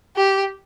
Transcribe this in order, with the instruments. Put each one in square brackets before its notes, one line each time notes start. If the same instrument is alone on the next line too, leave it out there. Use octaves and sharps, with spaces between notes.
[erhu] G4